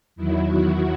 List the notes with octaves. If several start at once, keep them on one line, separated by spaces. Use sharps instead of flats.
E2 D#3 F#3 E4
F#4